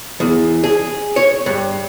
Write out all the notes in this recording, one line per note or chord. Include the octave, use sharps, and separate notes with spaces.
E2
G#4
C#5
G2